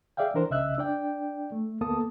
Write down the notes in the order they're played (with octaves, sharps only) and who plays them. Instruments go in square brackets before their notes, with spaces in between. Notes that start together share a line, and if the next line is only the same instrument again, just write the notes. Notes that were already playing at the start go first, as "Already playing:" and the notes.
[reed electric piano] G#4 D5 E5 F5 G5
E3 D4 A#4 C5
C2 C#3 D#5 E5 E6 F#6
D4 D5 G5
A3
D2 A#3 B3 A4 A5 D#6